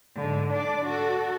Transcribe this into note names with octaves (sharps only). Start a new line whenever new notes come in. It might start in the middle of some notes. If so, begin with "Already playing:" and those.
G#2 D3
D4 D5
F#4 A4